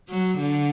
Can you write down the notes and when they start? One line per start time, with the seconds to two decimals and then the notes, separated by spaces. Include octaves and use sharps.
0.09 F#3
0.39 D3